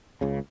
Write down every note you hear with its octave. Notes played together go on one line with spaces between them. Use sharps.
C#2 C#3